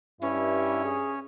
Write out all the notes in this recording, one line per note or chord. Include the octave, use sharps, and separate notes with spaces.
G2 C#4 E4
G#4